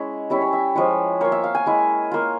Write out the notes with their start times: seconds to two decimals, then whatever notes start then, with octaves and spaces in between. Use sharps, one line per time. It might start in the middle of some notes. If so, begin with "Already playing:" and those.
Already playing: G#3 C#4 E4
0.30 G3 C#4 E4 E5
0.41 C#5
0.53 E5
0.75 F3 G#3 E4 C#5
1.21 A#3 F4 C#5
1.32 E5
1.44 F5
1.55 G#5
1.66 G#3 E4
2.11 A#3 F4